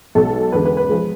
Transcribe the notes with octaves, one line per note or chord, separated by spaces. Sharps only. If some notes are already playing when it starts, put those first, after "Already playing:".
B1 B2 G#3 A4
E2 D3 G#3 B4
B4
B4
F3 G#3